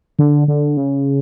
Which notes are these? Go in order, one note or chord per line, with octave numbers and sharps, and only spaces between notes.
D3
D3
C#3